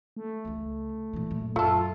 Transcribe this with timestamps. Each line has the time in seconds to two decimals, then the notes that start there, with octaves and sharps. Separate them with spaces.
0.17 A3
0.45 C#2 C#3
1.13 A#2 E3
1.31 F#2 A#2
1.56 F#2 A3 F4 A4